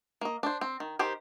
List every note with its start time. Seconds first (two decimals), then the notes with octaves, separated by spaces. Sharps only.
0.21 A#3 D#5
0.43 D4 C5
0.61 C4
0.80 D#3
0.99 D#3 G4 C5